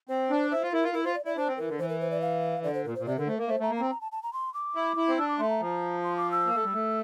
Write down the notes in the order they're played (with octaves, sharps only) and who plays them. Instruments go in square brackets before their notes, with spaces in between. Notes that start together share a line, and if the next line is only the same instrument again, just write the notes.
[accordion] C4 [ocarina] C5
[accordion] D4
[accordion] E4 [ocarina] C5
[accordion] F4
[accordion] E4 [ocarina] A#4
[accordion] F4
[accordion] E4 [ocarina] A#4
[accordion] F4 [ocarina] C5
[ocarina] D5
[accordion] E4 [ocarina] D5
[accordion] D4 [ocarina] C5
[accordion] C4
[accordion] E3 [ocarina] A#4
[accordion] D3
[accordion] E3 [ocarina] C5
[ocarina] A#4
C5
D5
F5
[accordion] D3 [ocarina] D5
[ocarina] C5
[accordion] A#2 [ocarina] A#4
[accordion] A#2 [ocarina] C5
[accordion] C3 [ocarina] D5
[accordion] D3 [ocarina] A#4
[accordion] A3 [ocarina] C5
[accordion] A#3 [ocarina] A#4
[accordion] A3 [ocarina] C5
[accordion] A3 [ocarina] A#5
[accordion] A#3
[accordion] C4 [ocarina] A#5
[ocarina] A#5
A5
A5
A#5
C6
D6
[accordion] E4
E4
C4
[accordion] D4 [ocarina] E6
[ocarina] D6
[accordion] A3 [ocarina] C6
[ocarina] A#5
[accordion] F3
[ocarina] C6
D6
E6
[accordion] A#3
A3
G3
A3